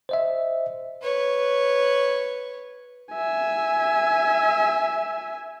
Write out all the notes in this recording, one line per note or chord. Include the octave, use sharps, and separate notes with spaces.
C5 D#5 E5
B4 C#5
E5 G#5